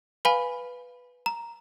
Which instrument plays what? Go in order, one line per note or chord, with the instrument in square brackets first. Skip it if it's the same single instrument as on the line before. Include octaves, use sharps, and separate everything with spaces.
[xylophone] B4 F5 G#5 B5
A#5